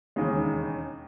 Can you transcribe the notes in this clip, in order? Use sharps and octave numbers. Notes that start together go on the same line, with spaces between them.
E1 D#2 C#3 G#3